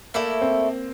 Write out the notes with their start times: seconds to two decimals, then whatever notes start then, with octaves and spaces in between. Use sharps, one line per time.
0.14 A3 A#3 E4 A4 D5
0.41 C4